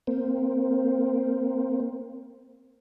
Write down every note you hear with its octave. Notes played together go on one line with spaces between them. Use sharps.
A#3 C4